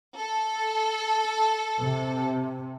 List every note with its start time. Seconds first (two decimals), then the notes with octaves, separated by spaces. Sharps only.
0.18 A4
1.81 C3